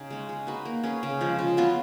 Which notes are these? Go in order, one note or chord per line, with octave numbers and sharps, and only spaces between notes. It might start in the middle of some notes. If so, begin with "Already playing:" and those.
Already playing: C#3 D#4 G#4
G#3 C#4
G#3
D#4 F#4 B4
A#3
C#4 G#4 B4
C#3
F3 G#3 C#4
C#3
F#3 B3 F4